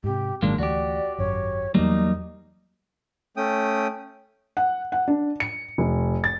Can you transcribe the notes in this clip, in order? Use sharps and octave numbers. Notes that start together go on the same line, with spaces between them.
G#2 C3 G4
G#1 A#2 D#3 F#3 G#3 A#3 D4
D2 E3 A3 F#4 G4 D5
G#1 F#2 C#5
E2 E3 F#3 G3 A3 A#3 D#4
A3 C#4 G5 D#6
F#5
F#5
D4
C#7
F1
A6